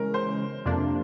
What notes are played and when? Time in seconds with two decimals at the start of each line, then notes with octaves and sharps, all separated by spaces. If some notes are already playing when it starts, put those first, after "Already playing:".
Already playing: C#3 E3 G#3 C#4 A#4
0.14 C5
0.65 F2 C3 F3 A#3 D4